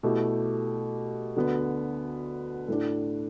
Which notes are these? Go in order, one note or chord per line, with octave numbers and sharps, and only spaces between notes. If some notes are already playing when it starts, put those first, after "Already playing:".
B2 A3 E4 G4
D2 D3 B3
A2 A3 D4